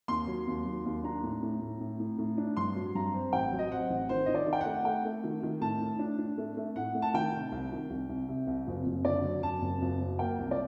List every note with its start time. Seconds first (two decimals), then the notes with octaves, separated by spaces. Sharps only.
0.08 D#2 C6
0.27 F#3
0.48 D#2
0.65 F#3
0.86 D#2
1.04 D4 A#5
1.24 A2
1.43 A2
1.61 A2
1.80 A2
2.00 A2
2.19 A2
2.38 D4
2.57 G2 C6
2.75 F#3
2.95 G2 A#5
3.14 C4
3.33 A1 G5
3.52 F#3
3.59 D#5
3.71 C4 F#5
3.90 A1
4.09 D#3 C5
4.26 D#3 D#5
4.35 D5
4.47 D#3
4.53 G5
4.61 F#5
4.66 A3
4.85 A3 G5
5.05 A3
5.24 D#3
5.43 D#3
5.61 A2 A5
5.81 A2
5.99 D4
6.18 D4
6.38 A3
6.57 A3
6.76 A2 F#5
6.95 A3
7.02 A5
7.14 D#3 G5
7.34 C3
7.52 C2
7.72 D#3
7.90 C2
8.09 C2
8.29 C3
8.47 C2
8.67 F#1
8.86 F#1
9.05 D3 D5
9.25 F#3
9.43 F#2 A5
9.62 F#1
9.82 F#1
10.01 F#3
10.19 A#3 G5
10.39 C2
10.51 D5